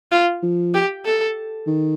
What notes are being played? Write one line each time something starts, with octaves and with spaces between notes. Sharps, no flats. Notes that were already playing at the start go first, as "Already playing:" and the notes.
F4
F3
G4
A4
D#3